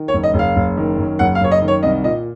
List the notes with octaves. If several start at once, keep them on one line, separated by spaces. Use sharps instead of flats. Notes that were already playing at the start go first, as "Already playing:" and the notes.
Already playing: D#3
C#5
F#1
D#5
F#1
F5
F#1
D#3
F#2
F#1 F#5
F5
F#2 C#5
D#5
D#3
C#5
C2 D#5
A#2 D#5